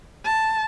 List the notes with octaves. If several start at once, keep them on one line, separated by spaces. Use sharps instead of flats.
A5